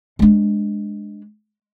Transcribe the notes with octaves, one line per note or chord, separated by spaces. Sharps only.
G#3 D4